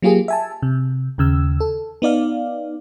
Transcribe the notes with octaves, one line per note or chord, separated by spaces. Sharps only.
F#3 A#3 F4 G4 G#4
E5 G#5 A5
C3
D#2 C#3 E6
A4
B3 D#4 D5 F5